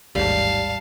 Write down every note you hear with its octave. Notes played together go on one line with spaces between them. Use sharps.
A1 D#2 G#2 G3 F5 A5